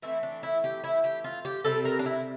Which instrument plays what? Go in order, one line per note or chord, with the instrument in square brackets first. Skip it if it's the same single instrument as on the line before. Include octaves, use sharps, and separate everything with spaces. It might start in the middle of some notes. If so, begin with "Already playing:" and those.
[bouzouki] E3 A3 C4 E4
D4
E4
G4
E4
G4
F4
G4
C3 G3 C4 A4
A#4
D4
E4